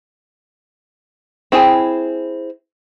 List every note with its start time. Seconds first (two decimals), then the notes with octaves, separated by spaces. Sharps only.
1.52 C4 E4 G#4 G#5